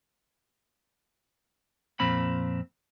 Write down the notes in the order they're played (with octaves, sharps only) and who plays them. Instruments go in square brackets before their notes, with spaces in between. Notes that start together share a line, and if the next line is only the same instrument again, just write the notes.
[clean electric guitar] F2 A#2 C4 B5